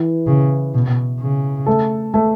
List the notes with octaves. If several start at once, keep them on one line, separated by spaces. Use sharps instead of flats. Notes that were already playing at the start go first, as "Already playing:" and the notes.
Already playing: E3 E4
C#3
B2
C#3
A3 A4
A3 A4